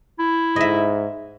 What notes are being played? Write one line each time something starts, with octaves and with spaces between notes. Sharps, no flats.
E4
G#2 D#5 E5